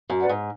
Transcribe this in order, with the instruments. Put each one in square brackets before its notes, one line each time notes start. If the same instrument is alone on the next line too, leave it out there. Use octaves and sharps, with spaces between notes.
[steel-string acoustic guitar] F#2
[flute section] B4 D5 F#5
[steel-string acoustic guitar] G#2